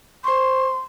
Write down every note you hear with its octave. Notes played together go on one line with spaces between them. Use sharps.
C5 C6 C#6